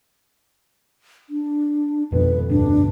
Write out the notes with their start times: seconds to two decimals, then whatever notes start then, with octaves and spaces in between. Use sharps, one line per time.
1.29 D4
2.12 G#1 F2 B2 B4
2.49 D2 G2 B2 D4